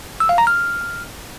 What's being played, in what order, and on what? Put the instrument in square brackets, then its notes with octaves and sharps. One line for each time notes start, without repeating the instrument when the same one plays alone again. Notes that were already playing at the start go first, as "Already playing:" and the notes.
[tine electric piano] E6
F5
A#5
F6